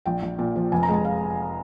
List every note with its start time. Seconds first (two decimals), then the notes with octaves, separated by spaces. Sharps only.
0.06 A#1 G5
0.22 A#1
0.39 A#2
0.56 F3
0.72 F1 G#5
0.83 A#5
0.89 G#3
0.94 G#5
1.05 F5